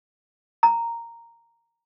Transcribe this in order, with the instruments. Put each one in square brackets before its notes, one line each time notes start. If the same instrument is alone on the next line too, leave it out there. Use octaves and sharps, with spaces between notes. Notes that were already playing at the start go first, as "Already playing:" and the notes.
[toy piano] A#5